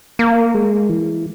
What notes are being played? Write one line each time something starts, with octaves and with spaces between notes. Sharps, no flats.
A#3
G#3
E3